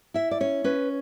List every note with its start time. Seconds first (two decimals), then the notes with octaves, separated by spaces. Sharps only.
0.14 E4 E5
0.31 D5
0.40 C#4 C#5
0.64 C#4 B4